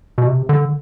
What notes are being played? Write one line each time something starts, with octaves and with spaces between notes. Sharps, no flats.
B2
C3
D3